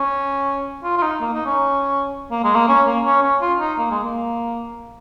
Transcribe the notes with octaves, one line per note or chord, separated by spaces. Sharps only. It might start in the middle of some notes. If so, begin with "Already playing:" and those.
Already playing: C#4
F4
F4
D#4
A#3
D#4
C#4
A#3
G#3
A#3
C#4
A#3
C#4
C#4
F4
D#4
A#3
G#3
A#3